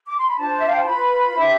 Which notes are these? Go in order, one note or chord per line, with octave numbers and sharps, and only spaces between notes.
D6
C6
B5
D4 F4 C5 A5
E5
F5
G5
A5
F4 B4 B5
F5
D4 G4 C5 E5